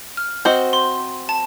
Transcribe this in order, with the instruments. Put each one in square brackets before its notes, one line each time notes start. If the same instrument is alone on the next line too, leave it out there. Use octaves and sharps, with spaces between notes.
[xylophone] F6
[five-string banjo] C4 F#4 C5 D#5
[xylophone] C6
A5